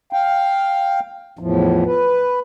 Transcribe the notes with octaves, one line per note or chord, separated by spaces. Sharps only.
F5 G5
E2 A2 F3
B4